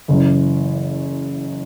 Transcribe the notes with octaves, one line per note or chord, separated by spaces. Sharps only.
F#1 F#2 E3